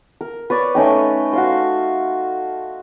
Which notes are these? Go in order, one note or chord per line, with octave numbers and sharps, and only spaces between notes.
A#4
B4 C#5 D5
A3 C#4 D#4 G5
F#4 F5 C6